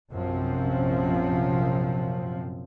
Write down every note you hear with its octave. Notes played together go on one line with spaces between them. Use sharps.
A#1 F#2 C3 F3 C4